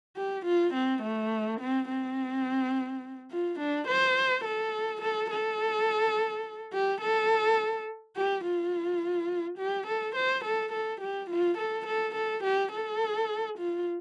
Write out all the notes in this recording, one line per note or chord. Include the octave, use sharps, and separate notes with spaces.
G4
F4
C4
A3
C4
C4
F4
D4
C5
A4
A4
A4
G4
A4
G4
F4
G4
A4
C5
A4
A4
G4
F4
A4
A4
A4
G4
A4
F4